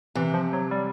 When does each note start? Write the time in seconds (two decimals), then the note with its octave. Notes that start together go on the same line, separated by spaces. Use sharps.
0.15 C3 E3
0.34 F3
0.53 F#3
0.71 G3